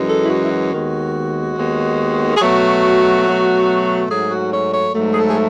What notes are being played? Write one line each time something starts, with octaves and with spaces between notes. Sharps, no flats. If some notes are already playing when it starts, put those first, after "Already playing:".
Already playing: F#2 E3 G#3
A4
E4
F#4
E4
F#4
D#2 D#3 G#3 B3
D#2 D#3 G#3 B3
G#4
B2 F#3 A3 F#4
B2 F#3 A3
G#2 F#3 A3 G#4
F#4
C#5
C#5
G#2 F#3 A3
G#4
A4
G#4